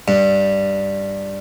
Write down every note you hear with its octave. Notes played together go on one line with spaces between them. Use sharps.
G2